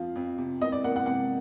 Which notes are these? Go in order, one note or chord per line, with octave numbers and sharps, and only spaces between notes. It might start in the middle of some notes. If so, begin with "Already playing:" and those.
Already playing: F2 F3 F5
F2
C3
C3 D#5
D5
A#3 F#5
F#5
C3 F#5